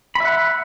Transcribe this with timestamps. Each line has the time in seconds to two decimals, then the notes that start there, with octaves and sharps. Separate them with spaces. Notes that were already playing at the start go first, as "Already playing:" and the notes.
0.15 B5
0.20 E5
0.25 F#5